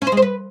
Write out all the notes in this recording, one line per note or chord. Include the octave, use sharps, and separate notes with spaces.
C#4
C5
G#3
C5
B4